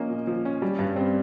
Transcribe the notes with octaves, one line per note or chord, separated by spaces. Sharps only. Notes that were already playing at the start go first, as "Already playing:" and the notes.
Already playing: F3 A#3 C#4 D#5
A#2
F3
C#4
G3
G2
C4